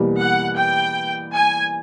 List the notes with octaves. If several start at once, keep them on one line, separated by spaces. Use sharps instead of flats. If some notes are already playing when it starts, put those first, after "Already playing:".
Already playing: E2 B2 G3 A#3
F#5
G5
G#5